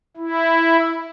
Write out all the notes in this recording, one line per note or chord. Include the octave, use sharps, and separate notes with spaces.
E4